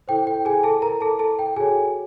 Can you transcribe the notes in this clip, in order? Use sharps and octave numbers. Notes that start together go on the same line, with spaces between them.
E4 A4 C5 G5
G5
G#4 G#5
A4 A5
A#4 A#5
A4 A5
A4 A5
G5
F#4 G#4 A4 C#5 G#5